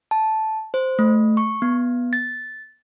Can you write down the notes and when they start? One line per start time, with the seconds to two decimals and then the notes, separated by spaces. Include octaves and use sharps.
0.11 A5
0.74 C5
0.99 A3
1.37 C#6
1.62 B3
2.13 A6